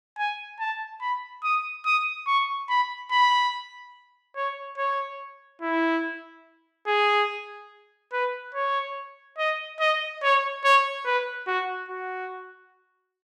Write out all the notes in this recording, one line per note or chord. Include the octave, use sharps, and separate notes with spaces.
G#5
A5
B5
D#6
D#6
C#6
B5
B5
C#5
C#5
E4
G#4
B4
C#5
D#5
D#5
C#5
C#5
B4
F#4
F#4